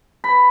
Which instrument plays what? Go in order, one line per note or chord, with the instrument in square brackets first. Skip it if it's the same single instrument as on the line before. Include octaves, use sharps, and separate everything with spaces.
[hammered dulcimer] B5